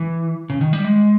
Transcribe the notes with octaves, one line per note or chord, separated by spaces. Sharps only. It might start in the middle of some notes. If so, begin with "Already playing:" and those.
Already playing: E3
C#3
D#3
G3
G#3